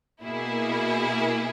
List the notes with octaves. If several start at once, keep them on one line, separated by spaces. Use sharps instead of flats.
B2 A#3 E4 G#4